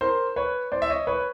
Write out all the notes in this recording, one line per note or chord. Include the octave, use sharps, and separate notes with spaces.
A#4 C5
B4 C#5
C5 D5
E5
C#5 D#5
B4 C#5